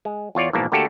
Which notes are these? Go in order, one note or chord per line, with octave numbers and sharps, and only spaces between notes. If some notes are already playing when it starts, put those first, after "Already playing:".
G#3
E2 F4 C#5 D5
A#1 G#2 B2 E3 A#3 A5
D3 A3 A#3 F#4 G4 A4